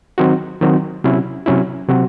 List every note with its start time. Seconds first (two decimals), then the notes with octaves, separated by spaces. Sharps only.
0.18 D#3 F#3 C4 D#4 F#4
0.61 D#3 F#3 C4 D#4 F#4
1.04 C3 F#3 C#4 E4
1.46 C3 F#3 C#4 E4
1.89 C3 F#3 C4 F#4